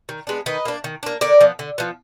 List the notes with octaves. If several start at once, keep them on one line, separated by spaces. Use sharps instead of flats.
D#3
G#3 B3 D4
D#3 B4 D#5
A#3 D4
D#3
A#3 D4
D3 A#4 D5
F3 B3
D3
F3 B3